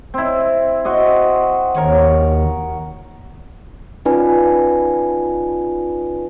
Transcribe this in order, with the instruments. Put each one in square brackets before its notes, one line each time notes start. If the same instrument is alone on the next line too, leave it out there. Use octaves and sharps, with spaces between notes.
[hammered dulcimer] C4 E4
F#4 C5 D#5
[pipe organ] D#2 [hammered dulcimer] A#4 C#5
[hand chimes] C#4 D#4 F4 B4 D5 G#5